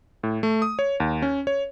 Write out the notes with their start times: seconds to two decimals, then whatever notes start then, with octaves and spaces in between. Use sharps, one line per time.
0.23 A2
0.43 A3
0.62 D#6
0.79 C#5
1.00 D#2
1.22 C#4
1.47 C#5